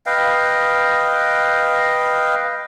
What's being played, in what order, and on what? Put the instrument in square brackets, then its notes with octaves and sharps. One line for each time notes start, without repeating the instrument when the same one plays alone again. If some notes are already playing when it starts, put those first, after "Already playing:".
[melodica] B4 D#5 F5 G5